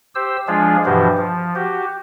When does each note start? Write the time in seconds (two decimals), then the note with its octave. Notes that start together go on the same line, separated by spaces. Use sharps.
0.15 G4 C5 E6
0.48 F3 G#3 D4 F4 G#4
0.86 G2 B2 E3 F3 F#4 G4
1.17 F3
1.55 F#4 G4